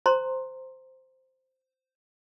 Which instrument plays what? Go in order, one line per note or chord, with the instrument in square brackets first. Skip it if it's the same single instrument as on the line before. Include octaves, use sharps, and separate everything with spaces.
[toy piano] C5 A#5 C6